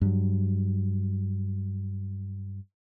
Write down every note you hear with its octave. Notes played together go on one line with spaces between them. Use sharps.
G2 F#3